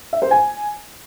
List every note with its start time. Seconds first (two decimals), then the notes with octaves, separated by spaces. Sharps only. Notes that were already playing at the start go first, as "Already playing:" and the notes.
0.13 E5
0.22 C5
0.31 G#5